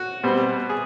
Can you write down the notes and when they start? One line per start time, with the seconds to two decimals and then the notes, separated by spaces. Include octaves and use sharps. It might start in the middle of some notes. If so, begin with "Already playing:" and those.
Already playing: F#4
0.24 B2 G3 C4
0.69 G#4